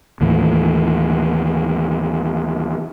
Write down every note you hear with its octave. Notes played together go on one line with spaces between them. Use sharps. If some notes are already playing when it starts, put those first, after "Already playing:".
D#2 A2 E3